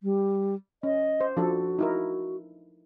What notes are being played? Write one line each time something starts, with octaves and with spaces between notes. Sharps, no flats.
G3
C#4 D#5
C5
F3 D4 F#4 A4
D#4 E4 A#4